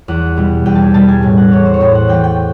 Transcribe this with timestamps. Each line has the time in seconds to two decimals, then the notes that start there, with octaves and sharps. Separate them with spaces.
0.08 E2 F#5
0.37 B2 G3
0.66 E2 G5
0.75 G#5 A5
0.94 B2 G3 A5
1.08 G#5
1.23 A2
1.37 F#5
1.51 E3 A3 C#5
1.66 C5
1.74 C#5
1.80 A2 C5
1.95 F#5
2.08 E3 A3 G5
2.24 G5